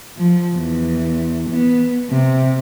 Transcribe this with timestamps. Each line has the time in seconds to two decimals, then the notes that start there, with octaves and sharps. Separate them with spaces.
0.18 F3
0.56 E2
1.50 B3
2.10 C3